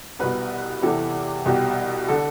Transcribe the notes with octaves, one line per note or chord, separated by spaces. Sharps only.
C2 B2 B4
E2 C3 E3 A4
C2 B2 G4
D3 A4